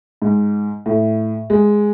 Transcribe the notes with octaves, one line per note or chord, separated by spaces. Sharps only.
G#2
A2
G#3